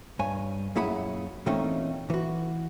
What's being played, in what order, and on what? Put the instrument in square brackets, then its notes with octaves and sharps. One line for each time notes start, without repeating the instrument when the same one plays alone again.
[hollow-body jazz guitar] G2 C#5 G#5
F#2 A#2 E4 G#4 F#5 B5
A#2 E3 A3 C4 C#4 D#4
E3 F#4